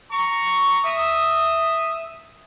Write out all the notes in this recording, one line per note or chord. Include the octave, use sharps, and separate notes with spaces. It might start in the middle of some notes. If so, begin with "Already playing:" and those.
A#5 C#6
E5 D#6